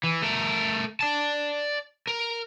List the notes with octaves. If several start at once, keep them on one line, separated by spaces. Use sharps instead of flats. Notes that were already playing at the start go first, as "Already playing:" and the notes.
E3
A3 A#4
D5 A5
A#4